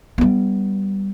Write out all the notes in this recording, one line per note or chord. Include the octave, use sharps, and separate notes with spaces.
G3 B3